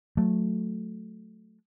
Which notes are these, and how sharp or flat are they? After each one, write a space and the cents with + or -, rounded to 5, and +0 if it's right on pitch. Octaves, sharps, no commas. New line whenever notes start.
F#3 -15 A3 -5